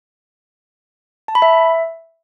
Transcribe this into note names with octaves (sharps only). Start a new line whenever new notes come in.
A5
B5
E5